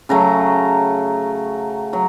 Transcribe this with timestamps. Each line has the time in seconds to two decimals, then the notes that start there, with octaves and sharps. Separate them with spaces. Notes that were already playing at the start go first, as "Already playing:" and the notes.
0.09 C#3 F#3 A3 A#5
1.93 F#3 A#5